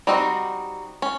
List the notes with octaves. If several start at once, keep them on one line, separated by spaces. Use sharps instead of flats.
G3 C4 D#4 F#4
C#4